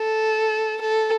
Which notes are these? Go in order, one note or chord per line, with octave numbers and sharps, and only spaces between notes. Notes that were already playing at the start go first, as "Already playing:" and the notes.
Already playing: A4
A4